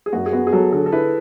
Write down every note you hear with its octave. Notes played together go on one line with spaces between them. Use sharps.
G#4
F#2 F#4
G#4
B3 F#4
G#4
F#3 A4
D3 A4
A4
E4 B4